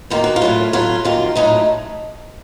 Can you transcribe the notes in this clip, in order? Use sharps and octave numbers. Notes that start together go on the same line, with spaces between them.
F#2 D#3 A#3 F4
F#4
F4
A2 F#3 A3
A2 F#3 A3 F4
F#2 D#3 A#3 F4
A2 F#3 A3 D#4